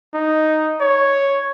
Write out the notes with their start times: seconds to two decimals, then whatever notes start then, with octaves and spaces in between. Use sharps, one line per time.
0.14 D#4
0.81 C#5